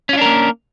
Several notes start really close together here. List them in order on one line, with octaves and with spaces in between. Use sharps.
C#4 F4 D4 A#4 A#3